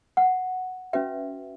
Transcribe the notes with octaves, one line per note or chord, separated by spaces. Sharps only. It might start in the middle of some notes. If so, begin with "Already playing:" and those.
F#5
C#4 F#4 B4 E5